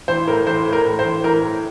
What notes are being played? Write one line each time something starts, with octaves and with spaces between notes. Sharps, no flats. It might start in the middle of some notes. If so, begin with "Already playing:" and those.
E3 C5
A2 A#4
E3 C5
A2
A#4
A2
C5
E3
E3 A#4
A2